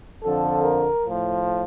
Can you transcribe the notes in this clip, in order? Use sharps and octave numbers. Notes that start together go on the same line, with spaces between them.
F2 D3 F3 A4
A#4
A2 F3